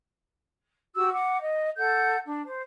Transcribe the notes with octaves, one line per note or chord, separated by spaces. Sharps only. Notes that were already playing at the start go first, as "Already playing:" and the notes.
F#4 G4 E6
F#5 D6
D#5
A4 F#5 G6
D4
C5